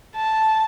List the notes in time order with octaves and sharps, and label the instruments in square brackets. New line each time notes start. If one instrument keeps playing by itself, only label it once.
[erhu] A5